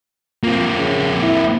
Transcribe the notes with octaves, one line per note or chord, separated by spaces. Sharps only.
A#3 C4 F4
C#3
E4